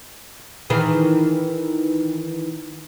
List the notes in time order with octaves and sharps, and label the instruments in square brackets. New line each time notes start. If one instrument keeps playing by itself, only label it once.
[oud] D#3 E3 G#4